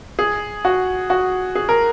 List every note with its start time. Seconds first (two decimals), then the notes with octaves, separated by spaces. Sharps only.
0.19 G#4
0.65 F#4
1.10 F#4
1.55 G#4
1.69 A#4